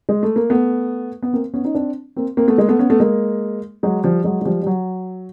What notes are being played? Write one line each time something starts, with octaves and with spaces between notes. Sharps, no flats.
G#3
A3
A#3
A3 B3
B3
A#3 C4
B3 C#4
C#4 D#4
C4 D4
A#3 C4
A#3 C4
A3 B3
G#3 A#3
A3 B3
B3 C#4
A3 B3
G#3 A#3
F#3 G#3
F3 G3
F#3 G#3
G#3
F3 G3
G3
F#3